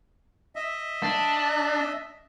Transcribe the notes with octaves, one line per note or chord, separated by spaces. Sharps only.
D#5 E5
D4